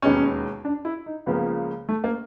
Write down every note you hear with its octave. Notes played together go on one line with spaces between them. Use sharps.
E1 D#2 D#3 G#3 B3 C#4
D4
E4
D#4
C#2 C#3 F3 A#3 B3
A3
A#3